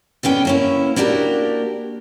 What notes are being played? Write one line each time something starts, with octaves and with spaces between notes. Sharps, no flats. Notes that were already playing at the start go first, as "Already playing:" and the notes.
D3 B3 C#4 G5
A#3 C#4 E4
A#3 D4 F#4 G4 A#4